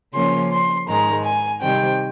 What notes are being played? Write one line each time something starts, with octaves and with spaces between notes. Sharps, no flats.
C#3 F3 A#3 C#4 C6
C6
G#2 D#3 G#3 A#5
G#5
C3 D#3 G3 C4 G5